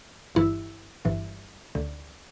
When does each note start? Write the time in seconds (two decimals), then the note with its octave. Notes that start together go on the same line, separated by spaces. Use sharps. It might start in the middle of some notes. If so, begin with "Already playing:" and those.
0.35 G1 G2 E3 E4
1.05 G1 G2 E3
1.75 D2 D3